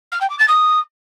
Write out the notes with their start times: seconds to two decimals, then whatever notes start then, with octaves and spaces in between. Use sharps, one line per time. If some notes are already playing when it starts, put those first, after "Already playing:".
0.12 F6
0.21 G5
0.30 D6
0.39 A6
0.48 D#6